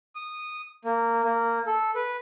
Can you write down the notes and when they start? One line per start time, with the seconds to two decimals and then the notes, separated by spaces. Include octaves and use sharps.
0.15 D#6
0.85 A#3
1.24 A#3
1.66 A4
1.95 B4